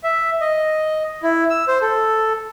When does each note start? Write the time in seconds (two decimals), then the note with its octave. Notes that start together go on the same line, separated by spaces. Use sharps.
0.04 E5
0.41 D#5
1.23 E4
1.50 E6
1.68 C5
1.81 A4